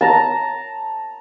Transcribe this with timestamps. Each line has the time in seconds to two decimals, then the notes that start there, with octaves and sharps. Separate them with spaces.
0.01 A5 A#5